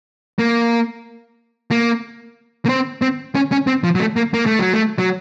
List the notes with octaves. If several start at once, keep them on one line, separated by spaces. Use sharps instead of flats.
A#3
A#3
A#3
C4
C4
C#4
C#4
C4
F3
F#3
A3
A#3
A#3
A3
F#3
A3
F#3